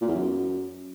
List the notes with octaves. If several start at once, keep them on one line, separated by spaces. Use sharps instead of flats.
A#2
E2
F#2